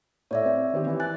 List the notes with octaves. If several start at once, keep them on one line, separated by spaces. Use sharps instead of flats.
A2 C#5 D5 E5
C4
D#3 C4 G4
E3
G#5 F#6 A6